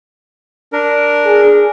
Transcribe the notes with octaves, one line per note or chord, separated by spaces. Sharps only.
D4 A#4
G#4